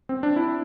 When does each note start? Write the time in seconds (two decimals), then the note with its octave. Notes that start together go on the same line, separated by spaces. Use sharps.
0.09 C4
0.23 D4
0.36 E4